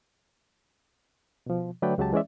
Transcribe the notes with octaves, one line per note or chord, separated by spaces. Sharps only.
B2 F3
D3 F#3 A3 B4 D5 G5
C#2 C#3 F#3 G#3 G4 A5
E3 G#3 C#4 D5 E5